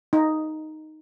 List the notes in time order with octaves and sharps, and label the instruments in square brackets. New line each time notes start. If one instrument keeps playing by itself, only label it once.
[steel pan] D#4